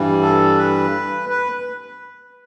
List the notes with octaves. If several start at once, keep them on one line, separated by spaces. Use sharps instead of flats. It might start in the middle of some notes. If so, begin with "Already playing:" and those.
Already playing: G2 E3 G3
A4
B4
B4